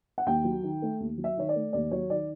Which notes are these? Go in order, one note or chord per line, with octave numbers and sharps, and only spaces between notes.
F#5
D#2 G5
F#3
D#3
A3
D#2
F#3
E5
D#3 C#5
D5
A3
D#2 D5
F#3 C#5
D#3 D5